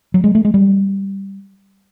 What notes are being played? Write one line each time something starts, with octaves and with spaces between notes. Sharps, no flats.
F#3
G#3
A3
G#3
G3